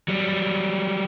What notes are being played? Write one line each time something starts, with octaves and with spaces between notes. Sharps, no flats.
F#3 G3